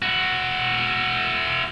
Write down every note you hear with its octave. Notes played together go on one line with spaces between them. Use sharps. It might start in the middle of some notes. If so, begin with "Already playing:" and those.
E4 F#4